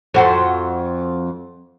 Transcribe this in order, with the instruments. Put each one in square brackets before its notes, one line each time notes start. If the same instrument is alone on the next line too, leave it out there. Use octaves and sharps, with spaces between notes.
[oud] F2 F#4 C5